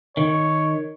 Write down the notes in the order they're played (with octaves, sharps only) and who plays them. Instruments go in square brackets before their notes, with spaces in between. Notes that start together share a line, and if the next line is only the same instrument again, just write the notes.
[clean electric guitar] D#3 [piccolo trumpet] C#5